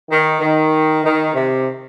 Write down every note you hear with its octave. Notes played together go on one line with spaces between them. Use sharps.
D#3
D#3
D#3
C3